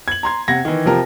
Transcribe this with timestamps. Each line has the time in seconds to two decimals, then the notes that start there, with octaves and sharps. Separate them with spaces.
0.08 G#6 F#7
0.23 A#5 C6 G#6
0.48 C3 F#5 G#6 A#6
0.65 D#3 E3
0.86 C3 F3 G4 A#4